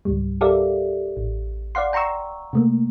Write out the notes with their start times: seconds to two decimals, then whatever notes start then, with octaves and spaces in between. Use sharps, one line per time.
0.05 C#2 G#2 G3
0.41 G4 A4 A#4 D5 E5 F5
1.17 A1
1.75 D5 F5 F#5 C6
1.93 G5 A#5 C6 C#6 E6
2.53 C3 A3 A#3